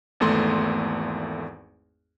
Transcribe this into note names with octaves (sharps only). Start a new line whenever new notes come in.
G#1 E2 A3 C6